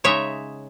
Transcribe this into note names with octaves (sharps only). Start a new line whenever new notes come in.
C#3 G#3 D#4 C#5 E5